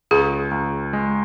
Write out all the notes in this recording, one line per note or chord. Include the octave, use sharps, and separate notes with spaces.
C#2 G#4
C#2
G#3